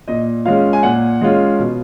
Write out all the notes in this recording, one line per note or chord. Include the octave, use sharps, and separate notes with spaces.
A#2 D#5
G#3 C#4 F4 F5
G#5
A#2 F#5
G#3 C#4 F4
B2